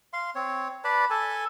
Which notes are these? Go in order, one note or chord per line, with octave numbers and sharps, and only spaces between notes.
F5 C6
C4 C#5
B4 D5 A5 B5
A4 G#5 A5